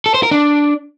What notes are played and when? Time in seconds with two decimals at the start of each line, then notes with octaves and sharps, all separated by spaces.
0.06 A4
0.14 C5
0.23 A#4
0.31 D4